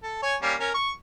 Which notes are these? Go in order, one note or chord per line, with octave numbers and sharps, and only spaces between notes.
A4
C#5 G#5
G3 A#3 C#4
C#4 A#4
C#6